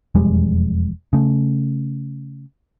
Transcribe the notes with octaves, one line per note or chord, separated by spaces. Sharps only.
E1 F2 G3 G#3
C#3 A3